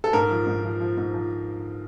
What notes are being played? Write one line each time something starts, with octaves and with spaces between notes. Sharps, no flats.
A4
G#2 A#4
F3
G#2
F3
F3
G#2
F3